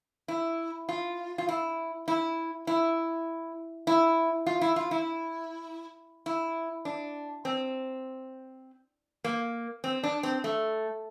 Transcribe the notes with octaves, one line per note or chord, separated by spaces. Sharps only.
E4
F4
F4
E4
E4
E4
E4
F4
E4
F4
E4
E4
D4
C4
A#3
C4
D4
C4
A3